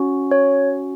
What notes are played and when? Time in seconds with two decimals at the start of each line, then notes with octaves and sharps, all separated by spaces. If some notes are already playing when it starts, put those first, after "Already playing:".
Already playing: C#4 F#4
0.31 C#5